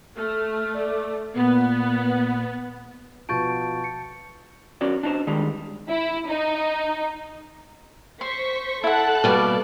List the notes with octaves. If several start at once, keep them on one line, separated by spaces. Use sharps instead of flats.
A3 F6
D5
A#2 B3
B2 F3 A5 C#6 G6 A6 D7
C#7
C#4 F#4 C#5 D5
D4 D#4 C5
D#3 G3 G#3 D#4
E4
D#4
C5 C6 C#6 B6
E4 A4 F#5 A5 F#6
B2 G3 A#3 D5